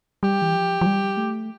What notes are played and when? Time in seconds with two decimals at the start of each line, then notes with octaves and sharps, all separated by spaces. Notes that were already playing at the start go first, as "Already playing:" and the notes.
0.23 G3 G4
0.42 E3
0.54 F3
0.81 F3
0.86 G3
1.17 A3